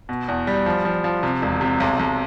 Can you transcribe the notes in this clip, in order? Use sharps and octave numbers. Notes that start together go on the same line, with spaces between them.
B2
E2
G3
F3
F3
F3
C3
E1
C3
B1
B1